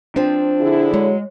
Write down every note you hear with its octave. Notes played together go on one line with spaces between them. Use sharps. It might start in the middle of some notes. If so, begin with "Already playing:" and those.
F3 C4 D4
D3 E4 G#4
F#3 G#3